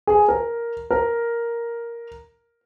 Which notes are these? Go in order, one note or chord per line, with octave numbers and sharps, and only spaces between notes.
G#4
A#4
A#4